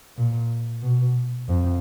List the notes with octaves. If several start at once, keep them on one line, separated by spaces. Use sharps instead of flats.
A#2
B2
F2